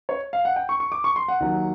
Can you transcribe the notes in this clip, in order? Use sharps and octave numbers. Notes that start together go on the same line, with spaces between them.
C#5
F5
F#5
G5
C#6
C#6
D6
C#6
C6
F#5
D#2 D#3 F#3